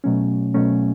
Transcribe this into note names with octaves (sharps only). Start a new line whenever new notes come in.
B2 F#3 A3 C#4
B2 F#3 A3 C#4